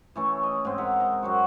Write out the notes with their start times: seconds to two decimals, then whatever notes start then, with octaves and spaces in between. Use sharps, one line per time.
0.16 E3 A3 C#4
0.43 D#5
0.65 G#2 C4
0.78 A#4 E5 F#5
1.00 D#5 A#5
1.23 F#2 C4 F#4